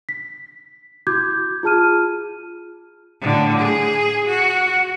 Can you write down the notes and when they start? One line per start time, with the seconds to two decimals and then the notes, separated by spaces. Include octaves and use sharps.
0.09 B6
1.07 E4 F#4 D6 G6 G#6
1.63 F4 G#4 A5 F6 D#7
3.21 A2 D3
3.59 G#4
4.27 F#4